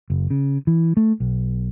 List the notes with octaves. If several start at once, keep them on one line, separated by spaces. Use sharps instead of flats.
F#1
C#3
E3
A3
B1